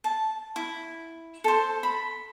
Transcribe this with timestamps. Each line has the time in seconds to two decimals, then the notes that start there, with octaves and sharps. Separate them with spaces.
0.04 A5
0.56 E4
1.44 A4 C5
1.83 B5